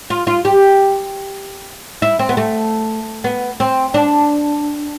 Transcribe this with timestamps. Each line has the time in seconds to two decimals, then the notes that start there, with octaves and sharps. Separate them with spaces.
0.10 F4
0.27 F4
0.45 G4
2.02 E4
2.19 C4
2.29 B3
2.37 A3
3.24 B3
3.60 C4
3.94 D4